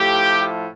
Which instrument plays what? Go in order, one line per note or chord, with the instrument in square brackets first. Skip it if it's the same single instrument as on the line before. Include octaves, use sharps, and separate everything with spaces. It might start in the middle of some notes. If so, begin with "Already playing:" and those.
Already playing: [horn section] A2 F3 A3 G4